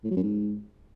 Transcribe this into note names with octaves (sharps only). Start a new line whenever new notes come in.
A2
F#3
F#2
G#2